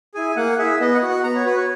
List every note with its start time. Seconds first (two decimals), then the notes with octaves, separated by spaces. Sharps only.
0.14 E4 G#4 G#5
0.36 A#3 F#5
0.58 E4 G#4 E5
0.80 B3 D#5
0.95 F#5
1.02 F#4
1.09 F#5
1.24 B3 A#5
1.35 C#5
1.46 F#4 B4
1.57 C#5